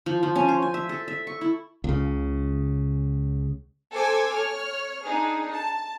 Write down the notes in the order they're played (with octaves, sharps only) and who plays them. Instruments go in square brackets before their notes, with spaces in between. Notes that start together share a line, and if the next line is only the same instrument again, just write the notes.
[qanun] F3
F3
C#4
C5
G#5
E5
A4
E5
C#6
E4
[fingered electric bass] C#2 C#3
[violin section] A4 C5 G#5 D6 E6 G#6
C#5 F6
D4 D#4 G#4
A5